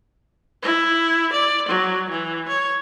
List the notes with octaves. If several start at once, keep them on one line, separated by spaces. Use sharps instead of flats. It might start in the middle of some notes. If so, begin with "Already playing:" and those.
E4
D5
F#3
E3
C#5